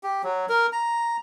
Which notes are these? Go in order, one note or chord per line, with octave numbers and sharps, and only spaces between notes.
G4
F#3
A#4
A#5